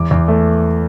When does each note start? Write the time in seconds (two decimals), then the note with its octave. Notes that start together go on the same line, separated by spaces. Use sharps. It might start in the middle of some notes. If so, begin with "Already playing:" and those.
Already playing: E2 D6
0.11 E2
0.28 A3